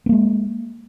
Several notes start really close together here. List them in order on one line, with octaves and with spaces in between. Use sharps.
B3 A#3 G#3